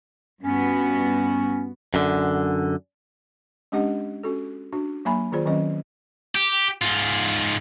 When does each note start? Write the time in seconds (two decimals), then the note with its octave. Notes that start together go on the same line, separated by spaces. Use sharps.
0.43 G2 B3 C#4 F#4
1.94 F#2 D3
3.72 G#3 C#4 D4 G4 D#5 F#5
4.23 C#4 F#4 A4
4.73 D4 F#4
5.05 F#3 A#3 E5 G#5 A#5 B5
5.32 D#3 F4 G#4 C5 D5
5.46 D#3 F#3 C4 C#4 D#5
6.35 G4
6.82 G#2 F4